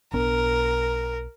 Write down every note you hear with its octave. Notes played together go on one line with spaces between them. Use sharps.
B1 B3 D4 A#4